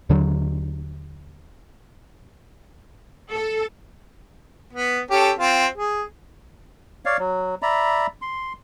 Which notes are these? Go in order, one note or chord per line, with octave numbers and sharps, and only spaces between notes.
D#2 D3 E3 F#3
A4
B3
C#4 G4 A4
C4 F4
G#4
C#5 D5 F5
F#3
D5 E5 A#5 B5
C6